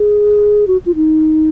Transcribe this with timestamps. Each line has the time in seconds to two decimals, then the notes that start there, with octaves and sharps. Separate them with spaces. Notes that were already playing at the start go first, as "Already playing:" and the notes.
Already playing: G#4
0.67 F#4
0.86 F4
0.95 D#4